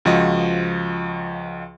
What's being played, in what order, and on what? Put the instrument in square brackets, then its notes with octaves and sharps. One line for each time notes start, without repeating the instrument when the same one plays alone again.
[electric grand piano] C#2 F3 F#4 D#5